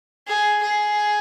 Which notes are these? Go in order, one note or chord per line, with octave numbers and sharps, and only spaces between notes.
G#4
G#4